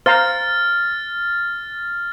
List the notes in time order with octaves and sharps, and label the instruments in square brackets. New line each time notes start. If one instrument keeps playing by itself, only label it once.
[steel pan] C5 F5 A#5 [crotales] F6 A6